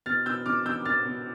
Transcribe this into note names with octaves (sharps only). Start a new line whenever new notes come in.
B2 F6 A6
B2 E6 G6
B2 D6 F6
B2 E6 G6
B2 F6 A6
B2